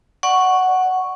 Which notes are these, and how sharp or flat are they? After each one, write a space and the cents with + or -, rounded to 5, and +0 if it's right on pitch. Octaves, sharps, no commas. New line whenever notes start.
D5 +20 F#5 +0 C#6 +0